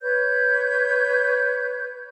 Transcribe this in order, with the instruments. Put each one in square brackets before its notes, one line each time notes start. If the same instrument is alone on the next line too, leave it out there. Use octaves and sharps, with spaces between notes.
[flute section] B4 C#5 G6